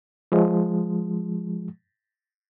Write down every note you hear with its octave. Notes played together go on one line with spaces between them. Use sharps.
F3 G#3